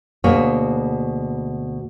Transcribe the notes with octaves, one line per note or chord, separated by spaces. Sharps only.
D2 B2 A#3 G#4 C#5